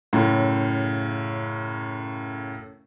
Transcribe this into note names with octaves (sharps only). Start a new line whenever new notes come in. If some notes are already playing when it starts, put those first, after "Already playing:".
F#2 A2 C#3